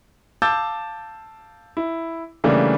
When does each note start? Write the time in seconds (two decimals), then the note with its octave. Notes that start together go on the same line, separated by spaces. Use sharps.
0.42 F5 A5 D6 E6 G6 A6
1.77 E4
2.44 C#3 E3 G3 A3 A#3 D4